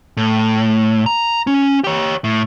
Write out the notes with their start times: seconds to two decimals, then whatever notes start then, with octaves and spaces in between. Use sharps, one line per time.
0.17 A2
1.06 A#5
1.47 C#4
1.84 G4 C#5
2.24 A2